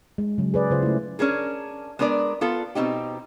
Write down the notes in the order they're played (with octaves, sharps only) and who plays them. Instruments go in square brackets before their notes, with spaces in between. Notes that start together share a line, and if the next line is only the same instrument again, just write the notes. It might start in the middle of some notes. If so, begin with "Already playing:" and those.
[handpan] G#3
C#3 F#3
G#4 B4 D5
C#3 F4 C5
A3 E4
[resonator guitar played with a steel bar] C#4 D4 G#4 A#4
G#3 B3 D4 A#4 D5
B3 F4 A4
B2 C4 D#4 G4